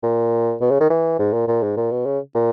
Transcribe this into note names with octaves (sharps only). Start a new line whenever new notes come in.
A#2
B2
C#3
D#3
E3
G#2
A#2
A#2
G#2
A#2
B2
C#3
A#2